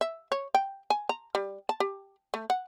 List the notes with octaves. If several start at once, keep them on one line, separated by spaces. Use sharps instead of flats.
E5
C#5
G5
G#5
A#5
G3
A5
G4
A3
F#5